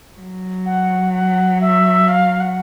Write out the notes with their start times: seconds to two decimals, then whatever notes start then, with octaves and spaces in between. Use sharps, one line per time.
0.19 F#3
0.66 F#5
1.13 F#5
1.61 E5
2.09 F5
2.40 F#5